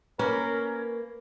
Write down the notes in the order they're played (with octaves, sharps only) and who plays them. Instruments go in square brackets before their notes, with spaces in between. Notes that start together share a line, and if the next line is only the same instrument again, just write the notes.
[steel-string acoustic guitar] A#3 [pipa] C#4 [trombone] A#4 [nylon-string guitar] B4